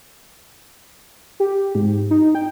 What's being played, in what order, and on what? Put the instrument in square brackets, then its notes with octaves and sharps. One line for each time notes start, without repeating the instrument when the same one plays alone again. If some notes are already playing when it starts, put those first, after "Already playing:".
[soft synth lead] G4
G#2
D#4
G5